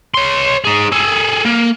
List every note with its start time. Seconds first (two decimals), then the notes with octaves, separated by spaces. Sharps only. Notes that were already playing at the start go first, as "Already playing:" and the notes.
0.14 C#5 C6
0.65 D#4 G#4
0.92 G#4 A4
1.45 A#3